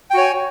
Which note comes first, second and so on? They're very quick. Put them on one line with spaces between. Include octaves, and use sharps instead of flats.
G5 F#4 C#5 G#5